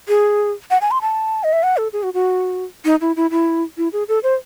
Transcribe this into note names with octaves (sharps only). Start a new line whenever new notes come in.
G#4
F#5
G#5
C6
A5
D#5
E5
F#5
A4
G#4
F#4
F#4
D#4
E4
E4
E4
E4
G#4
A4
C5